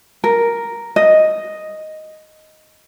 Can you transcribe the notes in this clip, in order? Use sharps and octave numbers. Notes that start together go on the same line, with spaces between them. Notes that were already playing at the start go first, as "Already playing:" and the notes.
A#4
D#5